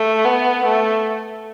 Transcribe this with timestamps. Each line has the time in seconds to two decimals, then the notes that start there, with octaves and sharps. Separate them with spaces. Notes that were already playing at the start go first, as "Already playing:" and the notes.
Already playing: A3
0.25 B3
0.65 A3